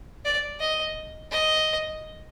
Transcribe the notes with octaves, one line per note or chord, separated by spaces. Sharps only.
D5
D#5
D#5